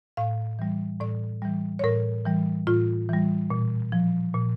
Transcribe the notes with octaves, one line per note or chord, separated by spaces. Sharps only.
A2 F5
E3 G3
A2 D5
E3 G3
C#5
A2 A#4
E3 G3
A2 F4
E3 G3
A#2
F3
A#2